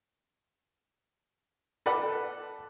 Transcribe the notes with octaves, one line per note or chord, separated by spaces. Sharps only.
A4 B4 D5 F#5